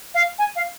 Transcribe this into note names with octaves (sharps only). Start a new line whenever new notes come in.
F5
G#5
F5